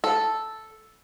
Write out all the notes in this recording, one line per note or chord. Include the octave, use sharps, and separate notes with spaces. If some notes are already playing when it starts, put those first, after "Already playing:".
A4